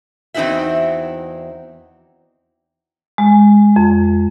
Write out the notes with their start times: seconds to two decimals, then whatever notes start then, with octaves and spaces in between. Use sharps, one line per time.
0.34 E2 C4 D#4 E4 F#4 E5
3.18 G#3
3.76 F2